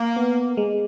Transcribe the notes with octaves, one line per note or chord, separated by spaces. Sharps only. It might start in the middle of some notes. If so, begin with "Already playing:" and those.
Already playing: A#3
B3
G#3